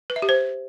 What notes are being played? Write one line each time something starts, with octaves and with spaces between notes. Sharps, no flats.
B4
E5
G4
C5